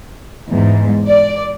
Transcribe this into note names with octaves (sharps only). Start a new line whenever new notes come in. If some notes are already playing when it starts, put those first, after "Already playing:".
E2 G#2
D5